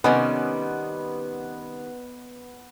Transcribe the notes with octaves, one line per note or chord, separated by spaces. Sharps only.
C3 D#3 G3 B3 C#4 D#5